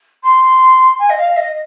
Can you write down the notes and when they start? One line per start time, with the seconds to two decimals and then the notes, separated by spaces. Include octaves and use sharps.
0.23 C6
0.99 G#5
1.10 D#5
1.18 F5
1.37 D#5